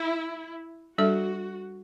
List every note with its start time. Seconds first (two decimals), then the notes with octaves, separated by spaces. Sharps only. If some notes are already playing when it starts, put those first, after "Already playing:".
Already playing: E4
0.97 G3 D4 F#4 A4 E5